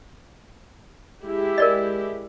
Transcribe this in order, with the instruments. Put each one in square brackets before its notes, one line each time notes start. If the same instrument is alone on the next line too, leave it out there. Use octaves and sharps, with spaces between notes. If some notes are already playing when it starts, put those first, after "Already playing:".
[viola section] G#3 E4 G4
[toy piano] A#4 D5 D#5